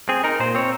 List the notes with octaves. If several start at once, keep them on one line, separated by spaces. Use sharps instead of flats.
C4 G#4
D#4 A#4
A#2 C5
C4 C#5